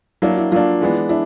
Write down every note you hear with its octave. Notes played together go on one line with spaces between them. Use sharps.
F#3 A#3 D4 E4
E4
F#3 A#3 D4 F4
E3 G#3 B3 D4
D4 E4